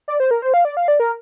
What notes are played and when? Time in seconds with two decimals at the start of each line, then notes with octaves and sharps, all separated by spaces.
0.08 D5
0.20 C5
0.31 A#4
0.42 C5
0.54 F5
0.65 D5
0.77 F5
0.88 D5
1.00 A#4